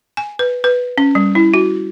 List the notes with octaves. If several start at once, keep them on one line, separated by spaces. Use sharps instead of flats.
G#5
B4
B4
C#4
G3
E4
F#4